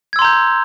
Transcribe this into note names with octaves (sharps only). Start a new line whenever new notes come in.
A#5 C6 E6 G6 G#6